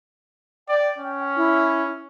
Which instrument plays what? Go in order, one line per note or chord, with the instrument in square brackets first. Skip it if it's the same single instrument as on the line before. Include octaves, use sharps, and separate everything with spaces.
[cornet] D5 [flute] G5
[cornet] C#4
[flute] E4